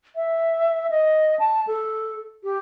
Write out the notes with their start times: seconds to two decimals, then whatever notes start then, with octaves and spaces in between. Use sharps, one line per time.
0.16 E5
0.90 D#5
1.39 A5
1.67 A4
2.44 G4